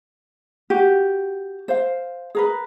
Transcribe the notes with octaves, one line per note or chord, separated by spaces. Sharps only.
F#4 G4
C5 F5
G#4 A#4 B4